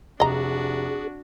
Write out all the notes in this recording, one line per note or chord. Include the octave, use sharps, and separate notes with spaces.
F1 D4 F#4 G#4 D#5 A#5